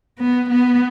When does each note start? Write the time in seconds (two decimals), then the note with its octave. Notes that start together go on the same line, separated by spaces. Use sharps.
0.19 B3
0.50 B3